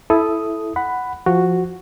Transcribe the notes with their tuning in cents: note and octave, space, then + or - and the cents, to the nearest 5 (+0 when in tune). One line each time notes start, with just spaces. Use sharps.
E4 +0 A4 -15 D#6 +0
F#5 +0 B5 +10
F3 +0 F#4 +0